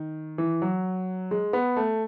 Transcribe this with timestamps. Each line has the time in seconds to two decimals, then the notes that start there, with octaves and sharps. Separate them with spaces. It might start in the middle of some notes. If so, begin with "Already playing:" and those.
Already playing: D#3
0.38 E3
0.62 F#3
1.31 G#3
1.53 B3
1.77 A3